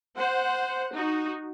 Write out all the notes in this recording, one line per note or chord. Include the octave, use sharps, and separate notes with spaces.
C5 F#5
D#4 F#4